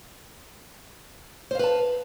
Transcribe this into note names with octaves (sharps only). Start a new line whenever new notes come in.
B4 C5 F5 A5